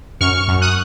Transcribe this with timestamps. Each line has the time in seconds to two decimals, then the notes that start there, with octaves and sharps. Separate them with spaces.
0.21 F#2 C#6 F6
0.48 F#2
0.62 D#6 F#6